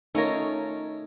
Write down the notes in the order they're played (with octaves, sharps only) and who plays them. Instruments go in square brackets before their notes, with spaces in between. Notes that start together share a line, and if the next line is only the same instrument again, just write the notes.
[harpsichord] A3 C#5 [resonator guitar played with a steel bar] C#4 F4 A#4 [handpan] D#4